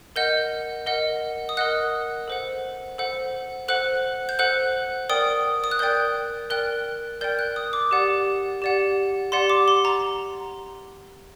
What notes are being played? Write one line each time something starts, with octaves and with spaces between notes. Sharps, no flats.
A#4 D#5 F#5 G6
A#4 D#5 F#5
D#6
A#4 D#5 F#5 F#6
A4 C5 F#5
A4 C5 F#5
A4 C5 F#5 F#6
G6
A4 C5 F#5 F#6
A#4 D5 G5 D#6
D#6
F#6
A#4 D5 G5 G6
A#4 D5 G5 F#6
A#4 D5 G5 G6
F#6
D#6
D6
G4 D5 F#5
G4 D5 F#5
G4 D5 F#5 C6
D6
C6
A#5